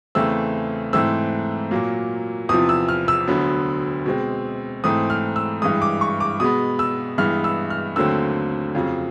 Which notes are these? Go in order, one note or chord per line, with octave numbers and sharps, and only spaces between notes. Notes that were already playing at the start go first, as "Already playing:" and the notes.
E2 C#3 E3 A3 C4 E6
G#2 E3 A3 C4 E6
A#2 F#3 A#3
E2 C3 F3 D#6
E6
F6
E6
D2 D3 F#3 B3
B2 G#3 C4
G#2 E3 A3 C4 D#6
F6
E6
G2 E3 G#3 D#6
D6
C#6
D6
B2 G#3 B3 D#6
E6
G2 E3 G#3 B3 F6
E6
F6
D#2 D3 F#3 A3 C4 E6
F2 C#3 F#3